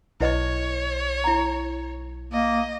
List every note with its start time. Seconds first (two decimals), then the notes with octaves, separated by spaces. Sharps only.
0.20 B1 E4 B4 C#5 D#5
1.24 E4 A#5
2.33 A#3 D#5